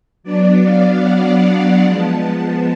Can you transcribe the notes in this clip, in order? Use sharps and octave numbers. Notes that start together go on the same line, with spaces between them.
F#3 B3 D4 D5
F5
F#5
F3 G#3 B3 A5